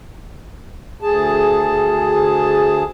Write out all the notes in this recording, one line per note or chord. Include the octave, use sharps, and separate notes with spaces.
D2 G#4 A5